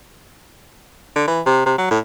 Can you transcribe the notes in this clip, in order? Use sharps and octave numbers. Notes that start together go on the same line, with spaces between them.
D3
E3
C3
C3
F#3
A2